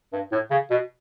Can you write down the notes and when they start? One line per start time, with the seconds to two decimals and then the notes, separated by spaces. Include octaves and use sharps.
0.13 G2
0.32 A2
0.51 C#3
0.70 B2